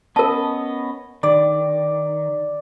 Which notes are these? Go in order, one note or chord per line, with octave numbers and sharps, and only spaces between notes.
B3 C#4 A#4 D#5 A5
D#3 D5